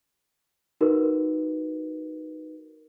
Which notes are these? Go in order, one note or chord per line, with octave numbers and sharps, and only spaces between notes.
D#4 F#4 A#4 B4